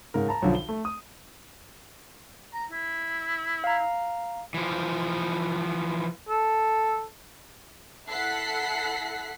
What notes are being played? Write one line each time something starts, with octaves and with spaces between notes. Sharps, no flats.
G#2 C#3 A#4
A5 A#5
B1 D3 F3
G7
A3
D#6
A#5
E4
F5 A#5
E3 F3
A4
E4 A4 F#5 F#6 B6 C7